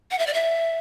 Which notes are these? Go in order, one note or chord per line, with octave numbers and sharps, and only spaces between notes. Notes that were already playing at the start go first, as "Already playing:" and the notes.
F#5
E5
D5
E5